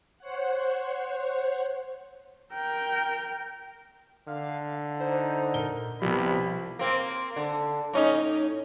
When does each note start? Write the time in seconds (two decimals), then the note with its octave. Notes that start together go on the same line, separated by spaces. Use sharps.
0.19 C5 C#5 F#5
2.53 A#4 G5
4.28 D3 F5
5.00 D#4 C5
5.54 A#2 A#4 G7
6.02 C2 B2 F3 G4 B5
6.79 A#3 C4
7.36 D3
7.93 A2 C#4 D#4